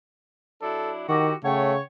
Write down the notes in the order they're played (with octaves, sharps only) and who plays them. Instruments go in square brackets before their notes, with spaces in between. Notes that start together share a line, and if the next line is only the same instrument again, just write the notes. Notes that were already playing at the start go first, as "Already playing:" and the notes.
[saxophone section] F#3 D4 E4 [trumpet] A4
[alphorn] D#3 [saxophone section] E4 F#4 [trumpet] G4 [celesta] C#6 D6 A#6
[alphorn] C#3 [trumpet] A3 [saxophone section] C#5 [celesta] F#5 G5